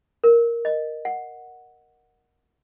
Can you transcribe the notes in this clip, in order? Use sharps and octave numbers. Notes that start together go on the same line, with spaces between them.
A#4
D#5
F#5